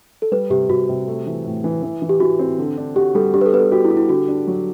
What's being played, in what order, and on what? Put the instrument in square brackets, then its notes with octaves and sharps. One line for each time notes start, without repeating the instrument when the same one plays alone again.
[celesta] A4
[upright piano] G3 [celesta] B4
[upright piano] C3 [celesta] G4
[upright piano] C3 [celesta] F#4
[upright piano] C3
A3
E3
A2
E3
E3
E3
[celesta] G4
[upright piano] E3 [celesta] F#4
[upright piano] C4
D3
D4
[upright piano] F#4 [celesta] G4
[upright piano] G3 [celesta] A4
[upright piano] D4 [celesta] G4
[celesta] B4
A4
[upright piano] B3 [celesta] B4
[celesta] A4
[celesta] F#4 [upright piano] G4
[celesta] E4
[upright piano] G4
[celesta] E4
[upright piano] D3 [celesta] F#4
[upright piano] D4
F#3